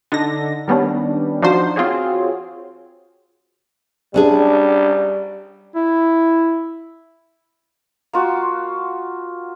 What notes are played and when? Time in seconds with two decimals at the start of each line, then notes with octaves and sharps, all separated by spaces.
0.12 D3 D#4 A#6
0.68 D#3 G3 B3 C#4 D4
1.42 F3 D4 D#4 F#4 C5
1.76 C4 F4 F#4 G#4 C#5
4.14 G3 C#4 D4 G#4
5.75 E4
8.13 A#3 F4 F#4